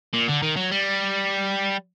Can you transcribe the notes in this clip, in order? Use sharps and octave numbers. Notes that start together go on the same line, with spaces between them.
A#2
D3
D#3
F#3
G3